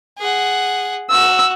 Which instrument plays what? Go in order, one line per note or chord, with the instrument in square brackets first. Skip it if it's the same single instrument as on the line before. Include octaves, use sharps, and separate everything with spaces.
[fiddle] G#4 F#5
[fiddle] F#4 [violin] E6